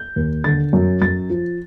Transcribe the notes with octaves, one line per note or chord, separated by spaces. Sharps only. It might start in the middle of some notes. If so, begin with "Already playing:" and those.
Already playing: G6
D#2
D3 A6
F#2
F#2 A6
F3